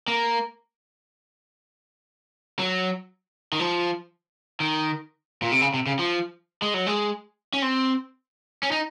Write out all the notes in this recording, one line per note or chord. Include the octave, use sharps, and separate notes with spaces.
A#3
F#3
D#3
F3
D#3
A#2
C3
C#3
C3
C#3
F3
G#3
F#3
G#3
C#4
C4
C#4
D#4